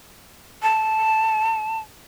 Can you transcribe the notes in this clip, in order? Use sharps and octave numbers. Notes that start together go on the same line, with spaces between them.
A5